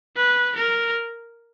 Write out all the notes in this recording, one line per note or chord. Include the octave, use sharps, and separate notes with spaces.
B4
A#4